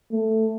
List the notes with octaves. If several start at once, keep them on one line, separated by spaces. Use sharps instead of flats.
A3